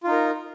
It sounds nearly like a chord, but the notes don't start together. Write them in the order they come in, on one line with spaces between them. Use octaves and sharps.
F4 D#4 A#4